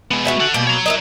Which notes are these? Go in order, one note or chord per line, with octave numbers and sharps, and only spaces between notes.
G#3 B3
F#4 E5 G#5
A4 F#5
B2 A#3 D5 G5
C#5 A#5
E4 A#4 D#5